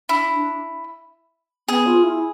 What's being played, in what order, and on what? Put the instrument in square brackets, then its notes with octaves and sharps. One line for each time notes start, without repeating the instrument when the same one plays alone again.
[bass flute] D4 [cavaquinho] E4
[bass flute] D4
[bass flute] B3 [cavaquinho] G#4
[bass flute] F4
E4